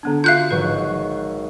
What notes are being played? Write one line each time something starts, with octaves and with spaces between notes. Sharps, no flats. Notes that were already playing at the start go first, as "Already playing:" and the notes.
D3 B3 D4
F4 F#4 E5 F5 F#6 G6
G#1 F#3 B4